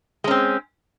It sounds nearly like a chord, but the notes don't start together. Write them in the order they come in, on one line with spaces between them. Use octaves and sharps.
G#3 C#4 C4